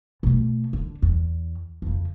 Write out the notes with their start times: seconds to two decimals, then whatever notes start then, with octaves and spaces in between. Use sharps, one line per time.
0.23 B2 A3
0.73 D3
1.02 E2
1.82 F2 C#3